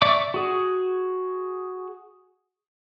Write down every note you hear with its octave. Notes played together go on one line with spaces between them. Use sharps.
D5 E5 C#6 D6
F#4 G#4